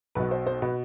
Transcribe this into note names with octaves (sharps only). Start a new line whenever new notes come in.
B1 B2 B4
C5
C5
B2 B4